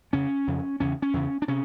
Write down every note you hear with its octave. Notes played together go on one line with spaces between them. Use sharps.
F2 C#3 C#4
F2 C#3
E2 C#3 C#4
C#4
E2 C#3
D4
C3 C#4